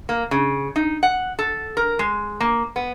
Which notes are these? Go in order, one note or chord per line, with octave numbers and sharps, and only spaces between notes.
A#3
C#3
D#4
F#5
A4
A#4
G#3
A#3
B3